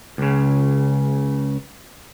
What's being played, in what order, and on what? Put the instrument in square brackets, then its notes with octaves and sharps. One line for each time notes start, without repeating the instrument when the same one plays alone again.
[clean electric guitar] C#2 C#3